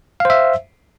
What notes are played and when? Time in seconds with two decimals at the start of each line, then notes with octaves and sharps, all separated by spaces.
0.20 F5
0.25 C5
0.30 E5